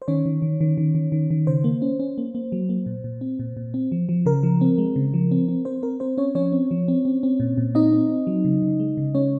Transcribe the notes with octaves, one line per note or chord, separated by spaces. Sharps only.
C5
D#3 C#4 C#5
D#3
D#3
D#3
D#3
D#3
D#3
D#3
C#3 C5
A#3
C#4
C#4
A#3
A#3
F#3
A#3
A#2
A#2
C4
A#2
A#2
C4
F3
F3
C#3 A#4
F3
C4
G#3
C#3
F3
C4
C4
C4 C5
C4 A#4
C4 C5
C4 C#4 C#5
F3 C#4 C#5
C4
F3
C4
C4
C4
A#2
A#2
C4 D#4 D#5
C4
C4
F#3
C#3
C#3
G#3
C#3
G#3 C#4 C#5